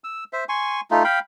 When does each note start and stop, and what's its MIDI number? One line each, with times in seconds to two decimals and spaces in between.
0.04 0.24 88
0.33 0.44 72
0.33 0.44 76
0.49 0.81 80
0.49 0.81 84
0.49 0.81 85
0.91 1.03 57
0.91 1.03 63
0.91 1.03 65
1.04 1.19 77
1.04 1.19 79
1.04 1.19 83